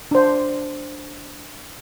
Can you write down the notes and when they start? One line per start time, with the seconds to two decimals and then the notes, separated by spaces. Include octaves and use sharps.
0.11 D4 C5